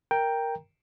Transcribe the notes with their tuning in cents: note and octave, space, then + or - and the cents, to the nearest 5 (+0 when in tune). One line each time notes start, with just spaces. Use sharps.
A#4 +0 G5 +5 A#5 +0